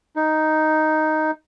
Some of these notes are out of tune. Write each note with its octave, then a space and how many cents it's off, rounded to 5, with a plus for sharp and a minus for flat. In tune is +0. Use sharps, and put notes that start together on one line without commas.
D#4 +0